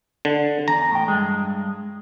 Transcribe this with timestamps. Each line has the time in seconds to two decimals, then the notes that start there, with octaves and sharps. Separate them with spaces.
0.25 D3
0.68 E2 A#5
0.91 A2 G5
1.08 G2 G#3